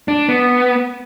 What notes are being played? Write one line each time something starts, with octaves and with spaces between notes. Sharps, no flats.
D4
B3